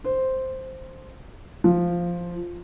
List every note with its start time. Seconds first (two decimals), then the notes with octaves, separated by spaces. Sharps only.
0.04 C5
1.64 F3